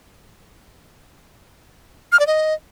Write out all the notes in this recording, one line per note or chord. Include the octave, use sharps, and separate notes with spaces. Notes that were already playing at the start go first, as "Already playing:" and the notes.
F6
D5
D#5